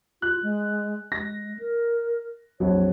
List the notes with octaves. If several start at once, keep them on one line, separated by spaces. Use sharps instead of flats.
F4 F#6
G#3
G#3 A#6
A#4
A#1 F2 F#3 C#5